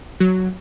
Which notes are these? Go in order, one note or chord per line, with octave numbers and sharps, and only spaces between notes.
F#3